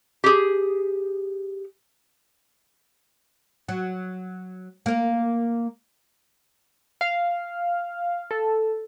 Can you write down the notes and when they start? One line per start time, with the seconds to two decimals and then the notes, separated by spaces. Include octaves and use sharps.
0.24 G4 G#4
3.69 F#3
4.86 A#3 A#4
7.01 F5
8.31 A4